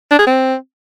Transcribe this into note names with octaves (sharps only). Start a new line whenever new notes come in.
D4
G#4
C4